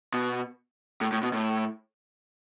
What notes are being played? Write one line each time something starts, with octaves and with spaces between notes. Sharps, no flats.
B2
A2
A2
B2
A2